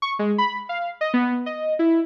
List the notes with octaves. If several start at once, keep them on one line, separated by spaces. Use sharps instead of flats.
C#6
G#3
B5
F5
D#5
B3
D#5
E4